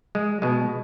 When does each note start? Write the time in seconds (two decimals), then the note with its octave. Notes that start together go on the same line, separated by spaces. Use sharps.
0.15 G#3
0.42 B2 G#3